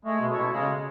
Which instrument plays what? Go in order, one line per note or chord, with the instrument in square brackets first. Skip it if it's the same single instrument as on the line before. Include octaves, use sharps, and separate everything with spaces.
[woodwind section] G#3 [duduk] A3
[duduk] B2
[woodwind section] C#4 E4 A4 C#5
[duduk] B2
[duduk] C#3 [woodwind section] G#3